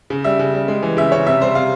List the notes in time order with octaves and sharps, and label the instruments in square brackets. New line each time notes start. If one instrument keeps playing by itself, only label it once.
[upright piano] C#3
G3 E5
C#3
G3
G#3
E3
C#3 E5
C#3 C#5
C3 E5
G3 C5
C3 F5